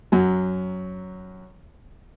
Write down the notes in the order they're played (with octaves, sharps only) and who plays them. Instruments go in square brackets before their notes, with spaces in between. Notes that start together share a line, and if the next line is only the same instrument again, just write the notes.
[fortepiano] F#2 F#3